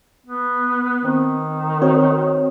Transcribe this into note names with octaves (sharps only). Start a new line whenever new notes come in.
B3
D#3 C4
C4 F#4 C#5